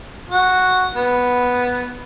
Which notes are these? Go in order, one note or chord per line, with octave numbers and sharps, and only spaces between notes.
F#4
B3